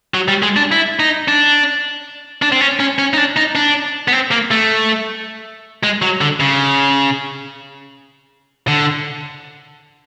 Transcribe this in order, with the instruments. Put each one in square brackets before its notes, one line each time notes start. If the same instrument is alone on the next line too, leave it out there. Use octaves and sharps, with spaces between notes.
[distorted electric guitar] F#3
G3
G#3
D4
E4
D#4
D4
D4
C4
C#4
C#4
C#4
D#4
D4
D#4
D4
B3
C4
A#3
A3
G#3
F#3
D3
C#3
D3